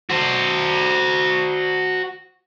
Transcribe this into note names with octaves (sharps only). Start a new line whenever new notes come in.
F#4 C5